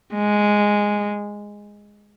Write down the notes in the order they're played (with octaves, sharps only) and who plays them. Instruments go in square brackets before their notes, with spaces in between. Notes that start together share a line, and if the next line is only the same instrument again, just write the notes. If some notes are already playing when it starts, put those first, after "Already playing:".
[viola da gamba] G#3